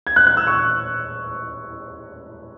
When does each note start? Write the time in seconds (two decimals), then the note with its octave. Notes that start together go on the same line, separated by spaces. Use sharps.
0.07 G#6
0.16 F#6
0.27 F#6
0.37 E6
0.47 C#6